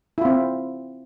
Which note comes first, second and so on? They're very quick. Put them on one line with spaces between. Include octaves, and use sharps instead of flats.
E4 F4 C4